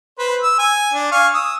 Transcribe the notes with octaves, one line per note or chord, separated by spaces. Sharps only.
B4 C5
E6
G#5
D4
F5 G#5 C#6
D#6 E6